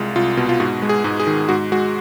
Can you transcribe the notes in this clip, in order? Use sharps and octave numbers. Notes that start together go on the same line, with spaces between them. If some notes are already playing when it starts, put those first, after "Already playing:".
Already playing: C2 G#3 F4
C2 F4
B2
F4
G#2 F#4
G#3
G#4
G#2
G#4
D#3
G#2 F#4
G#3 F#4